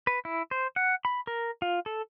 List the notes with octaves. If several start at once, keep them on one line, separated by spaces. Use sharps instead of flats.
B4
E4
C5
F#5
B5
A#4
F4
A4